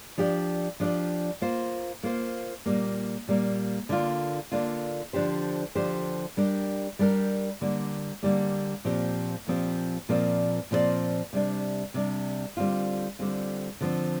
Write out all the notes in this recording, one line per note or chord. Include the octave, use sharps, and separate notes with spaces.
F3 D4 G4 D5
F3 D4 G4 D5
A#3 F4 C5
A#3 F4 C5
A#2 G3 A#3
A#2 G3 A#3
D3 A#3 D4 F4
D3 A#3 D4 F4
D3 F3 D4 G4 C5
D3 F3 D4 G4 C5
G3 D4 G4 A#4
G3 D4 G4 A#4
D3 G3 A#3
D3 G3 A#3
A#2 F3 C4 G4
A#2 F3 C4 G4
A#2 F3 C4 A#4 D5
A#2 F3 C4 A#4 D5
C3 G3 D4
C3 G3 D4
D3 G3 C4 F4
D3 G3 C4 F4
D3 F3 C4